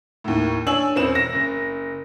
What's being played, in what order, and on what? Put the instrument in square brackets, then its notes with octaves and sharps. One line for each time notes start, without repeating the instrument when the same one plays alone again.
[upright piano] D#2 A2
D4 C#5 G#5 E6 F#7
E1 C4 C#4 B4 E7
A#6
F#1